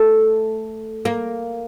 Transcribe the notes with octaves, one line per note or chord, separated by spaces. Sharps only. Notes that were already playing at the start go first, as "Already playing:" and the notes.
Already playing: A3
A#3